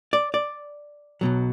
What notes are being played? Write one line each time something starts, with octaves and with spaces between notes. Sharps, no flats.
D5
D5
B1 B2 F#3